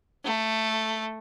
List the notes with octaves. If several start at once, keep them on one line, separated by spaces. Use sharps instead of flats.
A3